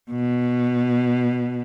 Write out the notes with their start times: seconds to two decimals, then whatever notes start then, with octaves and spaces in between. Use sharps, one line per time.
0.11 B2